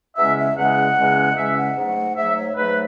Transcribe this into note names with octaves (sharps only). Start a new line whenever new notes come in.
E2 C#3 G#3 C#4 E5
E5
E2 C#3 G#3 C#4 F#5
E2 C#3 G#3 C#4
E2 C#3 G#3 C#4 E5
F#5
G#2 F#3 A3
G#2 F#3 A3 E5
C#5
G#2 F#3 A3 B4